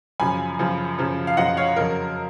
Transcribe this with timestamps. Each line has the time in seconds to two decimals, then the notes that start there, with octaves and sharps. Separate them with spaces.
0.20 F#2 C#3 F3 G#5 B5
0.59 F#2 C#3 F3
0.98 F#2 C#3 F3
1.27 F5
1.37 F#2 C#3 F3 D#5 F#5
1.57 C#5 F5
1.76 F2 C#3 F#3 A#4